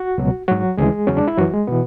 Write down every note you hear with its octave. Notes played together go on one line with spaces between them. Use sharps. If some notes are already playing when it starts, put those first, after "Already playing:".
Already playing: F#4
C#2 B2 F#3
G#2 F#3 F#4
D2 C#3 E3 G#3 G#4
E2 C#3 F#3 C#4
D4
E4
F#2 E3 F#3 F#4
G#3
B2 E3 B3